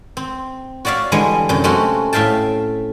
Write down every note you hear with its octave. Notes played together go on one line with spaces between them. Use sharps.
C4
F#4 C#5 D5 E5 F5
D3 E3 G3 G#3 D#5 G#5
F#2 C3
G#3 A3 C4 C#4 F#4 G4
A2 E5 F5 G5 A5